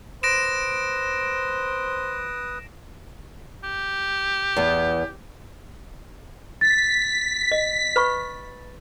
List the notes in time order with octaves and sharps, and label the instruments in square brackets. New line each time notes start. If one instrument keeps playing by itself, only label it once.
[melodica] B4 D#6 [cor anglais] C5 [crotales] A#6 D7 E7
[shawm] G4
[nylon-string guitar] E2 B3
[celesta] A6 [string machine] B6
[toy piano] D#5
B4 B5 C#6